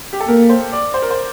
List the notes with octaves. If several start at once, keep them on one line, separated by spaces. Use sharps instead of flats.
G4
A4
A#3 A#4
C5
D5
C5
A#4
C5